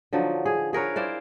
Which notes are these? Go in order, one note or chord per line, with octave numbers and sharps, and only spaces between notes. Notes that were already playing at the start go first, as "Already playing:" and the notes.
D3 F3 F#3 D#4
G#4
G#4 A#4 B4 C#5
E4 C5 D5 F5